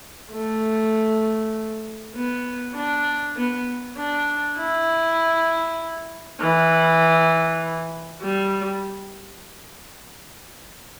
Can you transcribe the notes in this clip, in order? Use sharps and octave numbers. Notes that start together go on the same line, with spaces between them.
A3
B3
D4
B3
D4
E4
E3
G3